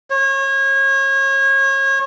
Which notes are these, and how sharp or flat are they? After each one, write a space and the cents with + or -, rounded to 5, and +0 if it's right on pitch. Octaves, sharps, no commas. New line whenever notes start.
C#5 -30